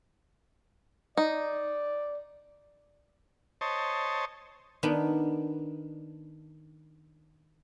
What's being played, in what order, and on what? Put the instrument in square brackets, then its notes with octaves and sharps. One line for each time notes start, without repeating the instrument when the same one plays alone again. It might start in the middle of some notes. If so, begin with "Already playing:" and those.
[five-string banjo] D#4 [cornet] D5
[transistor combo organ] C5 C#5 D#5 A5
[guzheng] D#3 B3 D4